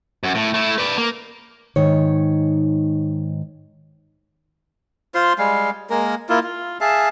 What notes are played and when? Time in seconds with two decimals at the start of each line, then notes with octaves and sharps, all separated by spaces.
0.23 F#2
0.35 A2
0.54 A3 E4
0.78 B4 D5
0.97 A#3
1.76 G#2 D#3 C#5
5.15 F4 C5 C6
5.39 G3 G#3 F5
5.90 G#3 A#3 A#4
6.29 A#3 E4 F4
6.43 F4
6.81 G#4 E5 F5 A5